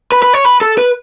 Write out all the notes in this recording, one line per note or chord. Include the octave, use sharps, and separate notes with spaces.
B4
B4
C#5
B4
A4
B4